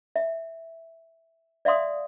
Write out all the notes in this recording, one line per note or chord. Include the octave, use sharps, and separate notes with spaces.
E5
D5 E5 F5 C6 D#6